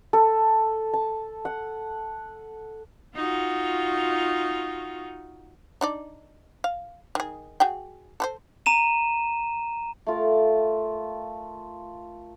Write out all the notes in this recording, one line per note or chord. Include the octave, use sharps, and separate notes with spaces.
A4
A5
F#5
D#4 F4 F#4
D4 D#4 D5
F5
D#3 G#4
F#4 G#4 G5
A4 B4 C5
A#5 D#7 E7
A3 F4 A#4